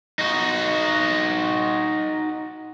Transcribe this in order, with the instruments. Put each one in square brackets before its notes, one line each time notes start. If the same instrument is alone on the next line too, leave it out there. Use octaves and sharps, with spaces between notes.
[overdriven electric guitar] D#4 F#4